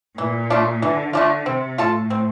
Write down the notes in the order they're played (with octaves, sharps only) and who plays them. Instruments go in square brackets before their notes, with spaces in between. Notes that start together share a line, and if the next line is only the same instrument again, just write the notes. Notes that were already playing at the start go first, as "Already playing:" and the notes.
[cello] A#2 [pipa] E3
[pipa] A3 D4 F4
[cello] D3 [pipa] E3
[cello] D3 [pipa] A3 D4 F4
[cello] C3 [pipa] C4
[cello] A2 [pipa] F4 A4
[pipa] C4